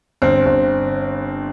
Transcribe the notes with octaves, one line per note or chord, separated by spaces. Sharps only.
G1 C4
G1